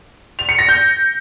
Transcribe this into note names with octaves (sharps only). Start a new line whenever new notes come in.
F7
C#7
A#6
G6